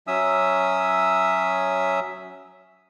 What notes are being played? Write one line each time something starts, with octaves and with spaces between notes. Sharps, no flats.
F#3 C#4 E5 D#6 E6